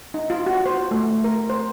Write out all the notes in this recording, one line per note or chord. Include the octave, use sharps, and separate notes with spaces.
D#4
F4
F#4
C5
A3
A#4
C5